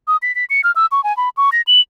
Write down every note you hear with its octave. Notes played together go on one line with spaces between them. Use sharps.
D#6
B6
B6
C#7
F6
E6
C#6
G#5
B5
C#6
A#6
F#7